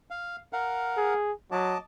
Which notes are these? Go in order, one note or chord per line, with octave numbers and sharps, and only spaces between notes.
F5
A#4 F5 F#5
G#4
F#3 D#5 A5 D6